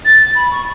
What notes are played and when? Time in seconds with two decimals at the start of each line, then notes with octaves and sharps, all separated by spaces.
0.05 A6
0.21 A6
0.35 B5
0.51 C#6